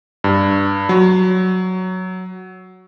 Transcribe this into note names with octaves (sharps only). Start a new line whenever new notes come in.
G2
F#3